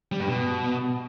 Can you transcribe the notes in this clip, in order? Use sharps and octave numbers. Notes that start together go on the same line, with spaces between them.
G3
G2
B2